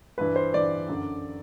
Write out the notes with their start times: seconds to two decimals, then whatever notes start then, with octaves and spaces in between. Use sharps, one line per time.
0.18 G2 E3 B4
0.36 C5
0.53 G2 E3 D5
0.88 F#2 D3